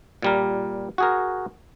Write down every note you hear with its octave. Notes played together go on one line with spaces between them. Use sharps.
A#2 G3 A#4
F#4 G#4 A#4